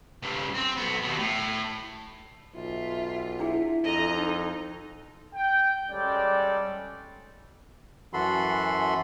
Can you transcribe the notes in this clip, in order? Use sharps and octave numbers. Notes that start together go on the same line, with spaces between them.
G2 C#3
C4
B1 B3
D#2 B2
A2
B1 F4 E5
D4 E4 G#4 E5
F2 A4 D#5 A#5
D#4
G5
G3 G#3 C#4 A4 D5 G5
F#2 E3 F#4 A4 B5 C6